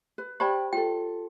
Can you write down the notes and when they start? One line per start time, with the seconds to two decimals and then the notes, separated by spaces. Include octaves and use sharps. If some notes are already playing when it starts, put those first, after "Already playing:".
0.18 B4
0.40 G4 C5 D5 G5 A5 B5
0.73 F4 A4 G5